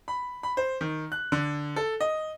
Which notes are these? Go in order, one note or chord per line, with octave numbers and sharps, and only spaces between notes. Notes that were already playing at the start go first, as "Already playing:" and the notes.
B5
B5
C5
D#3
F#6
D3
A4
D#5